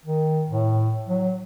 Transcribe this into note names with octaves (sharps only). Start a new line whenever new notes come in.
D#3
A2
F#3